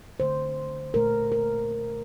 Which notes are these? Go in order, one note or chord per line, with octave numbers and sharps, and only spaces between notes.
D3 A3 C5
A#2 A3 A#4
A#4